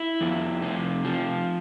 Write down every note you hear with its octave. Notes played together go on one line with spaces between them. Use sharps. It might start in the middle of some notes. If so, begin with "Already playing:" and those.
Already playing: E4
F2
C3
F3